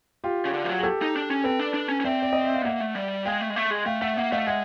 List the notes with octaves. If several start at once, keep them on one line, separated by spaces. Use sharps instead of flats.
F4 G4
C#3
D3
F3
F#3
G#4
G4 A4
D#4
D4
C#4
C4 A4 B4
D4
D4
C#4
C#4
C4 D5 E5
D5
D#5
E5
F5
B3
A#3 E5 F#5
A3
G3
G#3 F5 G5
A3
G#3
A3
G#3
A3 F5 G5
A3 E5 F#5
A#3 E5 F#5
A3 D#5 F5
G#3 E5 F#5